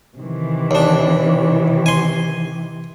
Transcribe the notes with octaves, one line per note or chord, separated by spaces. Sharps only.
C3 D#3 E3
D#2 D4
G#5 C6